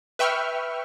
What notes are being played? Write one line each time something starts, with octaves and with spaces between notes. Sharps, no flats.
B4 E5 G5 C#6 F6